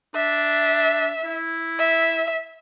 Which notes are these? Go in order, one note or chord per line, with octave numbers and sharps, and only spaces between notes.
D4 E5
E4
E5